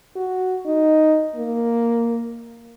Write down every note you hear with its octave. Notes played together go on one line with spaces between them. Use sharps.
F#4
D#4
A#3